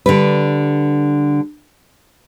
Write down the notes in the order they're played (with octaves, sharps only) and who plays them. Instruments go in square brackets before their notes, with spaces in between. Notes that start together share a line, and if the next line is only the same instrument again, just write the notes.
[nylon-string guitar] D3 G3 B4